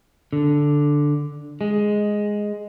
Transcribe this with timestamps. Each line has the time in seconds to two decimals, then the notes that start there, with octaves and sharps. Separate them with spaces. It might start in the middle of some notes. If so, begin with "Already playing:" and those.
0.33 D3
1.61 G#3